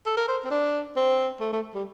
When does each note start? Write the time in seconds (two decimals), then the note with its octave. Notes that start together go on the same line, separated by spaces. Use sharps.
0.06 A4
0.17 A#4
0.28 C5
0.44 C4
0.50 D4
0.96 C4
1.40 A3
1.53 A3
1.74 G3